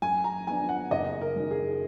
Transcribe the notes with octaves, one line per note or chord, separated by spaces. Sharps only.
F#2 G#5
A#5
F3 B3 D4 G#5
F#5
F#1 D#5
A#4
F#2 D#3 F#3
G#4